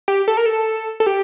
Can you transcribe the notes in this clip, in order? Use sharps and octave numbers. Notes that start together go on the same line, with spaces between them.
G4
A4
A#4
A4
A4
G4